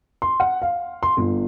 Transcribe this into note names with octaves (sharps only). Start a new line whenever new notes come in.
C6
F#5
F5
C6
G1